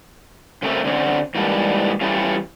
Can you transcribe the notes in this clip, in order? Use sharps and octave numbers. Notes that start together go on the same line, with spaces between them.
C#3 A3 C4 A#4 E5
D3 C4 C#4
G#2 E3 G3 A#3 D4
E3 G3 A3 C#4 F4